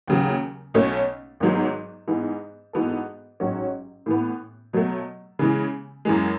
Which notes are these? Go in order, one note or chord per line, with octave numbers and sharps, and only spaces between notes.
D#2 C#3 F#3
B1 B2 A3 C#4
G#1 G#2 F#3 B3
G#2 E3 B3
G#2 E3 B3 F#4 A4
A1 G#2 F#3 C#4 F#4
A2 E3 B3
B2 F#3 A3
C#3 E3 G#3
F#2 E3 G#3